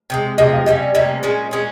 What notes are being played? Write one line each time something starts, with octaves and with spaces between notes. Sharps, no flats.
C3 F3 G#3
C3 F3 G#3 D#5
F5
C3 G3 A#3 C#4 D#5
C3 G3 A#3 C#4 D#5
A#2 G#3 C#4
A#2 G#3 C#4